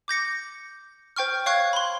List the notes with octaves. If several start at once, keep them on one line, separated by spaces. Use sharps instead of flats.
D6 G6 A#6 C#7
C5 G5 C#6 F6
C#5 F5 C#6 F#6 G#6
B5 C6